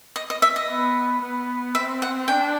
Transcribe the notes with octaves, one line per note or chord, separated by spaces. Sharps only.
D#5
D#5
E5
D#5
B3
B3
C4 E5
F#5
D4 G5